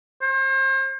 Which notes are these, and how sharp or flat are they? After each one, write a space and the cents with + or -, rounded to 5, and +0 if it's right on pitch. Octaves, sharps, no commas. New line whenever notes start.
C5 +40